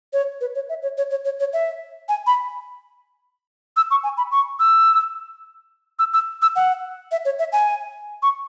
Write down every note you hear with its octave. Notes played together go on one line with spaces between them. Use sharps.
C#5
B4
C#5
E5
C#5
C#5
C#5
C#5
C#5
E5
G#5
B5
E6
C#6
G#5
B5
C#6
E6
E6
E6
E6
F#5
E5
C#5
E5
G#5
C#6